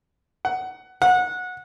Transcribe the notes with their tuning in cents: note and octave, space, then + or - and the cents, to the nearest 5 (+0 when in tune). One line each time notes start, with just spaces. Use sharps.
F#5 +15
F#5 -20